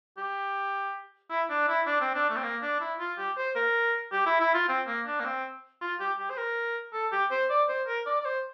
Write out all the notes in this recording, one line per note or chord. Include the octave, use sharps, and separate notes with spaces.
G4
E4
D4
E4
D4
C4
D4
A3
C4
A#3
D4
E4
F4
G4
C5
A#4
G4
E4
E4
F4
C4
A#3
D4
A#3
C4
F4
G4
G4
C5
A#4
A4
G4
C5
D5
C5
A#4
D5
D5
C5